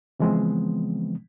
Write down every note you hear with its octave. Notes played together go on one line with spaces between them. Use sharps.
C#3 E3 F3 G#3 B3 C4